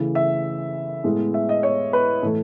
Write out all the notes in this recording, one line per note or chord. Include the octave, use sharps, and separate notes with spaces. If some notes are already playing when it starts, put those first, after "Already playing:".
Already playing: C#3 E3 A3
E5
A2 G#3 B3
E5
D#5
C#5
B4
A2 E3 A3